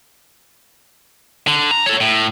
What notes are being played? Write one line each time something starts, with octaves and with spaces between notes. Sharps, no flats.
D3
A#5
A4 C#5
A2